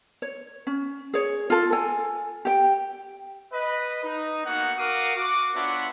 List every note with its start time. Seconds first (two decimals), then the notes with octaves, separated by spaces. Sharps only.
0.22 C#5
0.67 C#4
1.14 G#4 C#5
1.50 F4 A4
1.72 A4 G#5
2.45 G4 G5
3.53 B4 D#5
4.04 D#4
4.46 A#3 B3 D#4 F#4 F#5
4.78 F#4 A#4 F5 F#5 D6 D#6
5.16 F#4 D6
5.55 B3 D4 F4 C#5 E5 F#5